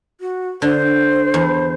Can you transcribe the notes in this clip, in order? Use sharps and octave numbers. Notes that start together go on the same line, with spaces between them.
F#4
D3 C5
E2